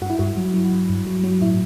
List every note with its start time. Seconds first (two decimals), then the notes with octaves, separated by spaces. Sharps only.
0.02 G2 F#4
0.10 E4
0.19 G2 F#4
0.37 F#3
0.54 F#3
0.72 G2
0.89 G2
1.07 F#3
1.24 F#3
1.42 A2 E4